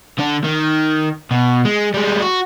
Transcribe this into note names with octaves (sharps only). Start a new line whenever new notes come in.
D3 D4
D#3
B2
G#3
G3 G#3
F#4